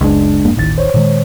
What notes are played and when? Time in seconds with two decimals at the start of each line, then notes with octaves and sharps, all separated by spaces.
0.01 F#1 C#2 G#3 D4
0.45 E1 G2 A#3
0.57 D#1 A1 A2 D#3 A6
0.78 C5 C#5
0.94 A#2 D#3 G#3